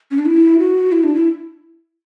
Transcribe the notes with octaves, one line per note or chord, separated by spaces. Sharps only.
C#4
D4
E4
F#4
E4
D4
E4